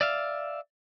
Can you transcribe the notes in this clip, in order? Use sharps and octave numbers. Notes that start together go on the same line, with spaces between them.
D5 E5 F5